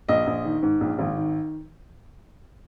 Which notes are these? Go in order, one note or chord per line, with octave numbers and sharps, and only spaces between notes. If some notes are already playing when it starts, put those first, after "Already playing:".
A#1 D#5
A#1
D#3
G#2
A#1
G#1
D#3